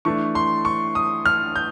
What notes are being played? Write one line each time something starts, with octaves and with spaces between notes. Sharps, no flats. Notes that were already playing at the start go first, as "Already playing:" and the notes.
E3 A3 D4 C#6
C6
C#6
D#6
F6
G6